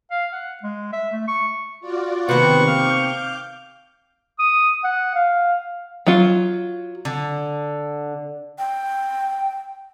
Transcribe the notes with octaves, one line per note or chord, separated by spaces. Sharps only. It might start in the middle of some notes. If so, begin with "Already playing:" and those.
F5
F#5
G#3
E5
A3
C#6
F4 F#4 D5
C3 D#3 A#3 B3 C5 F#5 C#6
F5 D6 G6
D#6
F#5
F5
F#3 F4
D3
G5